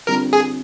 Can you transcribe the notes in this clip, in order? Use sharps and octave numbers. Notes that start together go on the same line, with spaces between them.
D3 G3 C4 F4 A#4
G#4